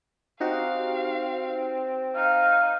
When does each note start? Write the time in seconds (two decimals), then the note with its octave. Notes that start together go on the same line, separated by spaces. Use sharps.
0.40 C4 D#4 F#4 G4 F5
2.15 D#4 F5